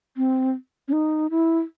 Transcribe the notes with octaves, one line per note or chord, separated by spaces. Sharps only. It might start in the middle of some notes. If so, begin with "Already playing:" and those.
C4
C#4
D#4
E4